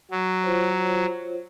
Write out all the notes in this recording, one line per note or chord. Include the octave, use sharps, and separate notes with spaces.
F#3
F4 C5 C#5